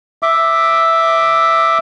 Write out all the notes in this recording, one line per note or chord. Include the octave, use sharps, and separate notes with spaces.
E5 D6